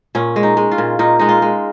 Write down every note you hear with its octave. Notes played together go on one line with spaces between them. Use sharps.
A#2 C#4
G#3
D#4
G#3
F4
A#2
A#2 D#4
G#3 D#4
F4
G#3